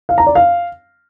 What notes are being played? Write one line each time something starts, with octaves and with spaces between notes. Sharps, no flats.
F5
A#5
D5
F5